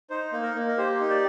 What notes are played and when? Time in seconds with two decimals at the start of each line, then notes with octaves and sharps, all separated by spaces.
0.10 D#4 C5
0.32 A#3
0.43 A#4
0.55 A#3
0.68 A#4
0.77 G4 C5
1.00 D#4
1.10 D5